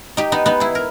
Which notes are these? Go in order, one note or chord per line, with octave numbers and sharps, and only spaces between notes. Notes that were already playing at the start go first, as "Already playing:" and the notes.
D#4 G4
B3 D#4
B3 D#4
E4 G#4
A#4